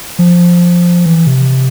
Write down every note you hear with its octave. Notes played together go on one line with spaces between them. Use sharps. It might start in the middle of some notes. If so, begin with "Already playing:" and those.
F3
E3
C3